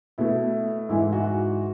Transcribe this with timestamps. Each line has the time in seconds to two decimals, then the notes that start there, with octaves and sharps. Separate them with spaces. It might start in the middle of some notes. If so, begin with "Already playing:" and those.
0.18 B2 A3 E4
0.89 G#2 E3 G#3 E4
1.13 F#4
1.24 F#4